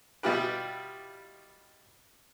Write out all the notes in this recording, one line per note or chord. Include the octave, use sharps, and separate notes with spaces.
B2 G3 E4 F4 G4 B4